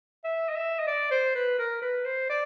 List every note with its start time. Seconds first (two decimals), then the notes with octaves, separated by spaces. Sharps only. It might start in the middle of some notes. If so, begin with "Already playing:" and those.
0.24 E5
0.49 D#5
0.56 E5
0.80 D#5
0.88 D5
1.11 C5
1.35 B4
1.59 A#4
1.82 B4
2.06 C5
2.30 D5